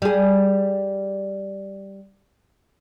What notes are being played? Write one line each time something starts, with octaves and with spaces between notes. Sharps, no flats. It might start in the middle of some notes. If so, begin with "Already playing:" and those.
G3 G#4